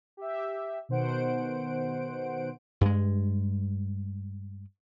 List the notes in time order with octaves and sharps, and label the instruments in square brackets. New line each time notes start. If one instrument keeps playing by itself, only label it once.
[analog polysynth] G4 E5
B2 D#3 C5 F#5 D7
[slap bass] G2 G#3